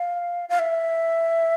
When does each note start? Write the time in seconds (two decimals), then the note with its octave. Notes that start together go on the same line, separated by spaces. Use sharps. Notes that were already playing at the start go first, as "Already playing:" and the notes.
Already playing: F5
0.49 F5
0.59 E5